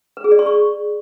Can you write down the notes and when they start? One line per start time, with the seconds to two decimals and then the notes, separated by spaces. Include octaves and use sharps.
0.17 B4
0.24 G#4
0.32 D5
0.39 C6
0.46 C#6